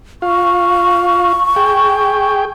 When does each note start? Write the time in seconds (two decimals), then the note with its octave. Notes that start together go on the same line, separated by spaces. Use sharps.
0.22 F4 F5 C#6
1.56 G#4 G5